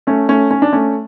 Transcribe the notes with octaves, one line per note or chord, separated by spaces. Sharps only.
A3 C#4
A3 C#4
C#4
D4
A3 C#4